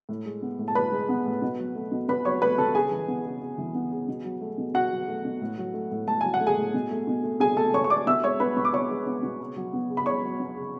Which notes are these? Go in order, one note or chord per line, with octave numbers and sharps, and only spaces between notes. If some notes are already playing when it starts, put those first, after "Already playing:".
A2
G#3
B3
A2
A5
A2 B4 B5
G#3
B3
A2
B2
F#3
A3
B2
B2 B4 B5
F#3 C#5 C#6
A3 B4 B5
B2 A4 A5
C#3 G#4 G#5
E3
B3
C#3
C#3
E3
B3
C#3
B2
F#3
A3
B2
B2 F#4 F#5
F#3
A3
B2
A2
F#3
A3
A2
A2 A5
F#3 G#5
F#5
A3
G#4 G#5
A2
B2
A3
B2
A3
B2 G#4 G#5
A3 A4 A5
B2 C#5 C#6
C#6
A3 D5 D6
B2 E5 E6
G#3 C#5 C#6
B3 B4 B5
B2 C#6
D6
B2 C#5 C#6
G#3
B3
B2
C#3
F#3
B3
C#3
B5
C#3 C#5 C#6
F#3
B3
C#3